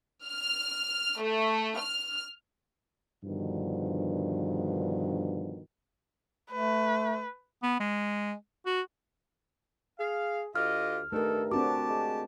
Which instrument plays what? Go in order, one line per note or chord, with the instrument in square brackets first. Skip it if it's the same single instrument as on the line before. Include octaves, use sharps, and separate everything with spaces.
[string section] F6
A3
F6
[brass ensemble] G2 B2 D3 D#3 F3
[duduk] A3 [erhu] B4
[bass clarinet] B3
G#3
F#4
[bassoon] G#4 [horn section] F5
[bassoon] D2 [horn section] F4 G4 D#5 [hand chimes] F6
[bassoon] G2 [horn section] D#3 D#4 A4 [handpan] A3 A#4
[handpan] C4 D4 F#4 [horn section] G4 A5 [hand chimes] D6
[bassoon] G#3